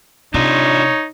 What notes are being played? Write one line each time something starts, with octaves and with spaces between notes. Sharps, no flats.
C3 D4 D#4 F4 C#5